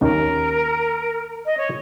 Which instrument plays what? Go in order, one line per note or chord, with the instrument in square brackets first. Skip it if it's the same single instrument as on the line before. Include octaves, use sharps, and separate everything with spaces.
[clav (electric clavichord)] D#2 D#3 A#3 C#4 [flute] A#4
[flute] D#5
C#5